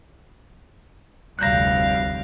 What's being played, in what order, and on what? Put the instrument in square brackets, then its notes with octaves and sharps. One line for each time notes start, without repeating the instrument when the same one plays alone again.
[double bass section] F1 D2 [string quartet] G3 F5 [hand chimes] F#6 G6 A#6